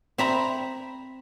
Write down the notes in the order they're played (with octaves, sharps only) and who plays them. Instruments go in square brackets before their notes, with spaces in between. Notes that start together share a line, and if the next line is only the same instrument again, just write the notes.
[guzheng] C4 E5 A#5 B5